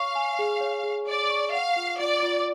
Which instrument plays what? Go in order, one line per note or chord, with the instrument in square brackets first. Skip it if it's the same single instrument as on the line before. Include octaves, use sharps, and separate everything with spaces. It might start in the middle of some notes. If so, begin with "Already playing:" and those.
Already playing: [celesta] C#5 C#6 [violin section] F5
[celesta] G#5
G#4
C#5
G#4
[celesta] C#5 [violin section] D5
[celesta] C#6
[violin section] F5 [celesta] F#5
[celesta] F4
[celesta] F4 [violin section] D5
[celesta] F4